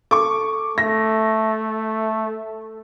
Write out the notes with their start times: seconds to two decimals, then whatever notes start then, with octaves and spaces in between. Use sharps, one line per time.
0.11 A4 C#6 D6
0.78 A3 A#6